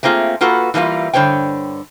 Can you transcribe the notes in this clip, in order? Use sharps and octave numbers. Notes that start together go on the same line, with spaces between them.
A3 A#3 C4 F4 G#4
A#3 F4 F#4 A4 B4
E3 G3 A#3 D4 F4
G2 D3 C5 C#5 G5